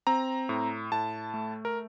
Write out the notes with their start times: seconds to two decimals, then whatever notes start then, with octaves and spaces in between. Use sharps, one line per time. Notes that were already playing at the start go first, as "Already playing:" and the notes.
0.07 C4 A#5
0.49 A2
0.92 A2 A5
1.34 A3
1.65 A#4